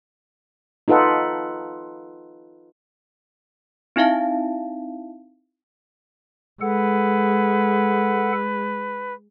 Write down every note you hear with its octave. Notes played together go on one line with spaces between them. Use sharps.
D#4 F4 A4 B4 F#5
C4 D#4 E4 E5 F5 A5
G#3 A4 B4 F#5